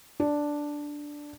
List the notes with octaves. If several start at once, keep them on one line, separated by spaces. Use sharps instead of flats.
D4